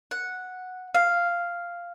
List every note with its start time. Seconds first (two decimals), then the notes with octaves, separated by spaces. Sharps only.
0.11 F#5
0.94 F5